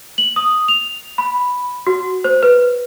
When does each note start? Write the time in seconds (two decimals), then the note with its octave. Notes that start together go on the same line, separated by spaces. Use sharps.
0.18 F#7
0.36 D#6
0.68 F7
1.18 B5
1.87 F#4
2.24 C5
2.43 B4